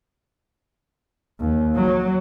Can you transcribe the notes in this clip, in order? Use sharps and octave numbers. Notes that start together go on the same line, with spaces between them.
D#2
F#3